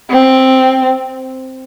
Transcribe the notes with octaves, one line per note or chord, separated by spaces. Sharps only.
C4